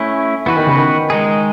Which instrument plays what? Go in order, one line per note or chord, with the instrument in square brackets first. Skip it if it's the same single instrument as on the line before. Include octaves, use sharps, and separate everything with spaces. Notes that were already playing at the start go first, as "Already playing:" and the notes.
Already playing: [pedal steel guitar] A3 C#4 E4
[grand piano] E3 [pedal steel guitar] B3 F#4 B4
[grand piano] D#3
C#3
D#3
[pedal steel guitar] G#3 D#4 G#4